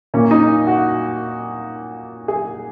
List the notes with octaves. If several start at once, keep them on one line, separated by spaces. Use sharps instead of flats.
A#2 A#3 C#4
D#4
F#4
G#4